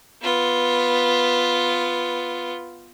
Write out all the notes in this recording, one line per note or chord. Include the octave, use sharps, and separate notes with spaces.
B3 F4